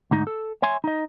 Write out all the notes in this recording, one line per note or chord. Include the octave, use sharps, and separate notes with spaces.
D2 G#2 D#4
A4
C#5 E5 G#5 C6
D#4 D#5